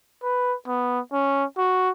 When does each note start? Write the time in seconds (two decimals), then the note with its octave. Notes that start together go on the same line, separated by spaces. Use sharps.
0.23 B4
0.68 B3
1.13 C#4
1.58 F#4